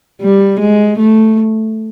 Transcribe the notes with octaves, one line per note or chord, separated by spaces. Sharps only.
G3
G#3
A3